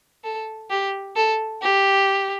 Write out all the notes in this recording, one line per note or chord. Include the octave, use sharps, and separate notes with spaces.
A4
G4
A4
G4